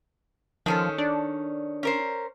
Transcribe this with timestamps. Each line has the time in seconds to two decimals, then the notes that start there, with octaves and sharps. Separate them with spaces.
0.66 D#3 F3 C#4 A4 A5 F6
0.98 D4 D5
1.83 C#4 A#4 C5